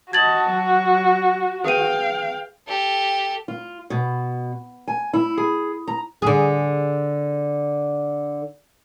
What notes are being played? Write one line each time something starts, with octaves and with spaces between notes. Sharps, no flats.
F#4 D#5 A5 G#6 A6 F#7
F#3
G#4 B4 F5 G5 D#7
G4 A4
F4
B2
G#5
E4
G#4
A#5
D3 G#4